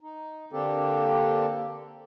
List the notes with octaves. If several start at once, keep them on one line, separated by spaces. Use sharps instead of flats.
D#4
D3 A#3 C4 D4 G4 A4